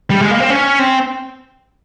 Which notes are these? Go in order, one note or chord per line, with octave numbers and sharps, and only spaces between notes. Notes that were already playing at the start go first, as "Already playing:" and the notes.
G3
G#3
A#3
C4
C#4
C4